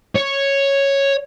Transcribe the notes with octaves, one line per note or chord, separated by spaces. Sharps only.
C#5